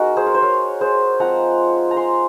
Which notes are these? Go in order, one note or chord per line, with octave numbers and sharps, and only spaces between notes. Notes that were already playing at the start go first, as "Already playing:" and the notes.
Already playing: G#3 D#4 F#4 A#4
G#4 C5
A#4
C5
A#4 C#5
G#4 C5
F3 G#3 C4 F4 F#5 A#5
A#5
G#5 C6